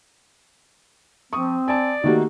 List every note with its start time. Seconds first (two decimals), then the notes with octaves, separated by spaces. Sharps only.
1.33 F3 C4 C#6 D#6
1.68 D5 G#5 A5
2.04 D#3 A3 A#3 D#4 F#4 G4